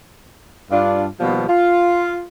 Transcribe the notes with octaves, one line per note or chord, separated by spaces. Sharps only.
G2 D4 F4
B2 D#3 F3 G3 A#3 B3
F4